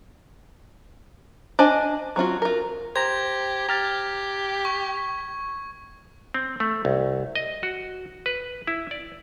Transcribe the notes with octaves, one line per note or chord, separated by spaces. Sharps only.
D4 C5 D#5 G#5
F#3 C4 F4 F#4
F4 A#4
G4 C5 A#5 G#6
G4 A#5 F6 A6
C#6
C4
A3
C2
D#5
F#4
B4
E4
D5